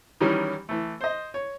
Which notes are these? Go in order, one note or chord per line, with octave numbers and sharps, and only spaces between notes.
D#3 E3 F#3 G3 C#4
E3 A3
C5 D#5
C#5